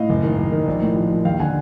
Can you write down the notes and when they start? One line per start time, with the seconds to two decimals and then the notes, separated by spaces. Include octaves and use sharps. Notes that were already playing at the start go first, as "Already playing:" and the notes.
Already playing: A2 D#5 F5
0.09 F#1
0.24 D#3
0.38 F#1
0.52 D#3
0.67 A#1
0.82 A2
0.96 F3
1.11 F3
1.25 D#2 F5 G5
1.40 D3 F#5 G#5